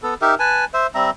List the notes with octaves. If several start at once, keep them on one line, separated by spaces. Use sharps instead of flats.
B3 A4
D#4 G4 A#4 E5
B4 G#5 A5
C5 E5
G3 C4 E5 A#5